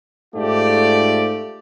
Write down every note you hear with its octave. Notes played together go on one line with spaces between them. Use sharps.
G#2 A3 F4 G4 D5